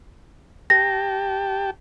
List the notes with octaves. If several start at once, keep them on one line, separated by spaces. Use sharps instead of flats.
G4 G5 A5 A#6